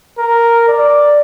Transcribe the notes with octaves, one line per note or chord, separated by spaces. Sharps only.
A#4
D5